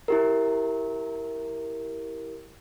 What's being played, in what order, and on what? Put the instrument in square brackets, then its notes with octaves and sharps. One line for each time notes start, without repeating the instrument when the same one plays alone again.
[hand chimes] E4 G4 A#4